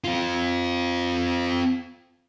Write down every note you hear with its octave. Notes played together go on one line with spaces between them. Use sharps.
C4 F4